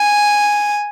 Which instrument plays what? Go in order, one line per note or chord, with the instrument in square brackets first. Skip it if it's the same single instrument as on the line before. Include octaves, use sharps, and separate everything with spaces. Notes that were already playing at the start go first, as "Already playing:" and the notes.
Already playing: [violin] G#5